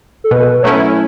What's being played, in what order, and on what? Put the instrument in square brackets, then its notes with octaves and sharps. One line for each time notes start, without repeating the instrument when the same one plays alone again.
[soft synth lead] A4
[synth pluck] B2 [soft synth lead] B4
[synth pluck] F#3 A3 C#4 E4 [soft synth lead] C#5